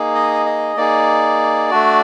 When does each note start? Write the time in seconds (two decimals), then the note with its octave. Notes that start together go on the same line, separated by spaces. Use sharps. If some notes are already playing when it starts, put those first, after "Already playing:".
Already playing: A#3 D#4 G#4
0.15 D#5
0.46 D#5
0.76 A#3 D#4 G#4 D5
1.71 A3 D4 F#4